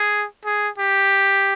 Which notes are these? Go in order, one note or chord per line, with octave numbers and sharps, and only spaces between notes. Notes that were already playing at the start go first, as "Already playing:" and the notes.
Already playing: G#4
G#4
G4